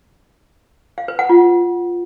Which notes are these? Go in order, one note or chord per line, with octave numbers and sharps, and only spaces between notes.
F5
B4
F#5
F4